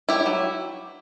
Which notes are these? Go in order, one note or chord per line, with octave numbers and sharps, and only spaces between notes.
F#3 E4 G4
F#3